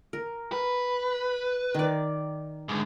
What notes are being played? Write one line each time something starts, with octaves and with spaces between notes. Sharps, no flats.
A#4
B4
D#3 D5
G#2 D3